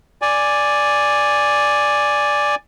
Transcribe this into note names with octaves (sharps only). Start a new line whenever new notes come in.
D5 G#5